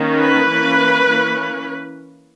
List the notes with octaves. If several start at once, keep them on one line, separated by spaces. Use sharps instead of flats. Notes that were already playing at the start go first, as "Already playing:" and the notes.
Already playing: D#3 A#3 C#4
B4
E3 A#3 C#4
E3 A#3 C#4